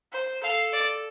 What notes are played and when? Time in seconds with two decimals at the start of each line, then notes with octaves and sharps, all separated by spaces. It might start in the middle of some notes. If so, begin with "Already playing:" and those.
0.12 C5
0.44 A4 F5
0.72 D5